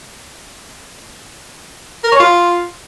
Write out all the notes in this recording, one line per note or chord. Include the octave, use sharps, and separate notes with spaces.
A#4
C#5
F4